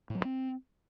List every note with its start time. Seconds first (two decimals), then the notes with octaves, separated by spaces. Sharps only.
0.10 A2
0.15 F#3
0.20 G2
0.25 C4